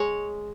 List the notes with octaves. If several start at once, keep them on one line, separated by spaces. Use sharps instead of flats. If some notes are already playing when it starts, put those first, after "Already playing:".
Already playing: G#3 C#5